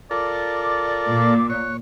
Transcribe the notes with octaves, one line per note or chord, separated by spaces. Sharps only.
F4 A4 A#4 D5 D6
A#2 D6
C#5 F#6